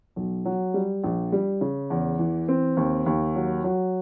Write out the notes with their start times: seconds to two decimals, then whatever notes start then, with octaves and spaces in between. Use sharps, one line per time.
0.16 B1
0.45 F#3
0.74 G3
1.03 A#1
1.32 G3
1.61 C#3
1.90 E2
2.19 E3
2.48 C4
2.77 D#2
3.06 D#2
3.35 F#3
3.64 F#3